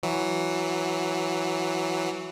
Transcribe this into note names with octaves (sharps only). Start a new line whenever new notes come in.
E3 F#3